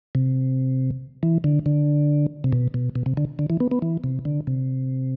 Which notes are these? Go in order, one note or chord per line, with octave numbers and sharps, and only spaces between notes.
C3
E3
D3
D3
C3
B2
B2
B2
C3
D3
D3
E3
B3
B3
E3
C3
D3
C3